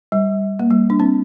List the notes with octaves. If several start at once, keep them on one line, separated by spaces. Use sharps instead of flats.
G3
A#3
G3
D4
C4